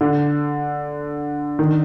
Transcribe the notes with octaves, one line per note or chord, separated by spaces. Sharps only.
D3
D#3